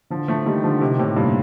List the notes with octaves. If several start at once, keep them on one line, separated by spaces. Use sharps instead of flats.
D3 F3
F3 A3
D#3 G3
D3 F3
C3 D#3
A2 C3
G2 A#2